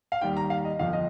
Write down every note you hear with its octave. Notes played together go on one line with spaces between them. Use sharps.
F5
D#2 D#3 G3 G5
A#5
F5
D#5
G1 F2 F3 F5
D#5